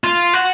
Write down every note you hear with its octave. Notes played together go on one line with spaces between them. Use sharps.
F4
F#4